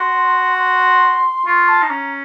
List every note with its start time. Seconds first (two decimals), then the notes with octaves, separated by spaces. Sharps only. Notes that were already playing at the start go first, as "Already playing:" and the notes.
Already playing: F#4 C6
0.58 C6
1.46 F4 C#6
1.68 A5
1.82 D#4
1.89 C#4 A#5